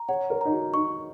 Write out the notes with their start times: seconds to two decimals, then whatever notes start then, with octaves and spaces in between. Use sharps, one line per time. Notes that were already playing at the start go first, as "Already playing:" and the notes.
Already playing: A#5
0.09 C#5 F#5
0.30 A#4
0.41 D#4 A#5
0.51 F#4
0.74 D#4 C#6